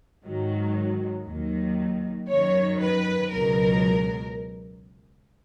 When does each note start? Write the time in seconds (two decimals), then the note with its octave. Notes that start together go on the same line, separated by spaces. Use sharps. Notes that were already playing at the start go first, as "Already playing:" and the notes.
0.25 G#2 D#3 F#3
1.27 D#2 D#3 F#3
2.29 F#2 D#3 F#3 C#5
2.81 B4
3.32 C#2 B2 F#3 A#4